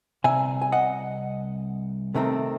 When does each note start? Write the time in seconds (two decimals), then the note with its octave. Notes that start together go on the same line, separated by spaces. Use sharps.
0.24 C2 C3 E5 G#5
0.61 G#5
0.72 D#5 F#5
2.14 C3 D#3 A3 C4